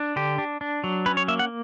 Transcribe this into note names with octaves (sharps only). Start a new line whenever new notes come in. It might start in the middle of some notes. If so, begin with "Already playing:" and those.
Already playing: D4
D3 G4
D4
D4
F#3
C#4 B4
C#5
A#3 E5
F#5